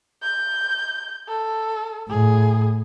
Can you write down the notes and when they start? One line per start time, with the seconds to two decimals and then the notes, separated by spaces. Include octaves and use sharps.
0.22 G6
1.28 A4
2.10 A2 G#4